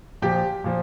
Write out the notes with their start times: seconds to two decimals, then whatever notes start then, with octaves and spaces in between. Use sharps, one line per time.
0.22 A#2 F3 G4
0.64 A#2 F3